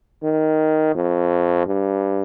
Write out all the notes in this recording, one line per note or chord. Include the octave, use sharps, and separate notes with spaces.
D#3
F2
G2